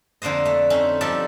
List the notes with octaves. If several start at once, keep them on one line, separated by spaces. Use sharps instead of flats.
F2 D3 A#3 C5 D#5
A3
A3 C4 C#4 D#4
F3 G3 D4 D#4 A4 D5